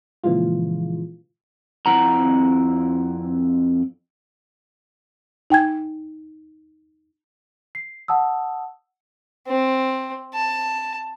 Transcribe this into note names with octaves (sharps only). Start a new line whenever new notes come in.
A#2 C#3 E3 F3 G#3 F4
F2 A#2 C4 E4 F#5 A#5
D#4 G5 G#5 G#6
C7
F#5 A5 D#6 E6
C4
A5